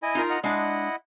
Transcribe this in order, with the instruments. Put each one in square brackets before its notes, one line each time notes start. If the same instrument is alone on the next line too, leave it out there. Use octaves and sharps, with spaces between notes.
[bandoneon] E4 D#5 G#5
[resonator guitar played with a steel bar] D#4 F4 A#4
[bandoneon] D#5 F#5 A#5
[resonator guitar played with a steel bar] G#3 D4 [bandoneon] E4 D#5 F#5